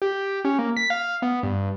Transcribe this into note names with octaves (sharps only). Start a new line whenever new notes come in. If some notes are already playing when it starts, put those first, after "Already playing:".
G4
C#4
A#3
B6
F5
B3
G2